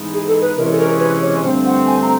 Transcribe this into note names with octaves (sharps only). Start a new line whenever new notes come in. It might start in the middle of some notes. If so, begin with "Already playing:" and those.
Already playing: G#2 E3 G#3 B3 D#4
G#4
A4
B4
C3 E3 G#3 C#4 A#4
A4
A#4
B4
C#5
G2 D3 F3 A3 C4 C5
F#5
G#5
A#5